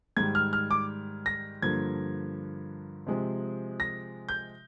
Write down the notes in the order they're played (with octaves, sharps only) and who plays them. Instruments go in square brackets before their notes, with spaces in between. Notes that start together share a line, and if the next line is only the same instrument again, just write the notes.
[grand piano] G#2 D#3 G3 G#6
F6
F6
D6
A#6
G2 D3 F3 A#3 G#6
C3 F3 G#3 C4
A#6
G6